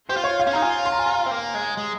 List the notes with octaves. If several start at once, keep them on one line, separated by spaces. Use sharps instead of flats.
G4 C5
F4
C#5
F5
C#4
D#4 A#5
F4 G#5
C6
A#5
G#5
A#5
C4
A#3
G#3
G#3